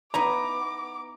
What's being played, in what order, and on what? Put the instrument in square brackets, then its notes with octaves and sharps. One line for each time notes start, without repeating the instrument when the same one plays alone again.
[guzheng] B3 D#4 E4 [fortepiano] A#5 [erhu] D6